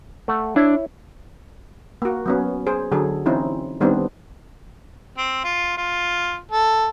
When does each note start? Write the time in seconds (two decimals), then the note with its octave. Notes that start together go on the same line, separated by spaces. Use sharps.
0.28 A3 F#5
0.56 D4 E4 C#5
2.02 A#3 F#4
2.26 F#3 B3 C#4
2.67 G#4 C5
2.92 D3 F#3 G#4 A4
3.26 E3 C4 C#4 D#4 E4
3.81 D#3 G3 B3 C4 D4
5.18 C4
5.44 F4
5.77 F4
6.51 A4